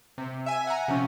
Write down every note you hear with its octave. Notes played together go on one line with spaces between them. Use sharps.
C3
E5 G#5 D#7
F#5 G#5 A#5
C3 F3 C#4